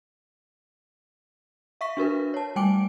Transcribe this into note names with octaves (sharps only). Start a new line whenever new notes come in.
E5 F5 C#6 B6
D4 F#4 A#4 B4
C#5 A5
G3 A3 G5 G#5 D6 D7